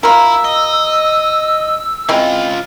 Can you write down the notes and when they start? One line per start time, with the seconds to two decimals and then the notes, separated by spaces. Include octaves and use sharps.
0.03 E4 F4 A#4 E6
0.45 D#5
2.09 C#3 G#3 C4 E4 F4